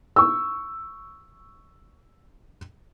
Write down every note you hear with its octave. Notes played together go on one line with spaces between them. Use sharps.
C#6 E6